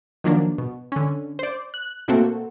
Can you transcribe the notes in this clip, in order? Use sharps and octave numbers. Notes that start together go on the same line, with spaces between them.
D#3 F3 F#3 A#3 D4
B2
D3 C#4
C5 D5
F#6
B2 A3 A#3 C4 F#4 A4